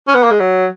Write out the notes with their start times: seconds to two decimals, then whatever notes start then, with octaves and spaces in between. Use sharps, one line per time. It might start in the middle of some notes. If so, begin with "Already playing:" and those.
0.07 C#4
0.14 B3
0.23 A#3
0.31 G#3
0.40 F#3